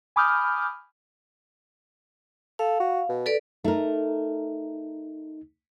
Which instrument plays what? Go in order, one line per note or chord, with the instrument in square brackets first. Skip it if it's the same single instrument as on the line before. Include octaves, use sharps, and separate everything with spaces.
[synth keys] G#5 B5 D6 D#6 F6 G6
[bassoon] A4 [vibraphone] F5
[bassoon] F#4
B2
[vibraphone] A4 B4 D5
[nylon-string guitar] A3 A#4 [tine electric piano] D#4